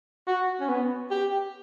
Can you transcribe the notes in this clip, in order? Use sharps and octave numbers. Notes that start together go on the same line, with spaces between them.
F#4
C#4
B3
G4